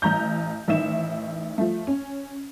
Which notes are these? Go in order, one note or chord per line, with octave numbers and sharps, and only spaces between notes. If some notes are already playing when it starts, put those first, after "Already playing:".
A1 A#5 G6
A1 D#3 E5 E7
F3 A3
C#4